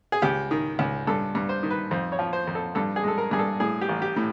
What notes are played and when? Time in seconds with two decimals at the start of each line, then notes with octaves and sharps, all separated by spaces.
0.12 G#4
0.22 C#2 G4
0.51 D#3
0.79 C#2
1.07 G2 A4
1.35 G2
1.49 C5
1.63 D#3
1.70 B4
1.91 F2 C5
2.12 C#5
2.19 F3
2.33 C5
2.47 F2
2.55 A4
2.75 G2 A4
2.96 G#4
3.04 G#3 A4
3.18 A#4
3.31 G2 G#4
3.39 A4
3.60 A2 G#4
3.81 G4
3.89 A1
4.02 G4
4.16 A2